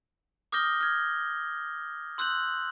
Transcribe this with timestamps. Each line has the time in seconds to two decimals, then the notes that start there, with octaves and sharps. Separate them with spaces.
0.52 D6 D#6 F6 G6 A#6 G7
0.81 F6 G#6
2.18 C6 E6 F#6 G6 F#7